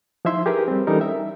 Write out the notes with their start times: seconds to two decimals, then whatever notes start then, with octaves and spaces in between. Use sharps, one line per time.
0.25 F3 D#4 E4 E5 C6
0.46 G4 G#4 A#4 B4
0.68 G3 C4
0.87 E3 G3 C#4 D#4 A4 A#4
1.01 E5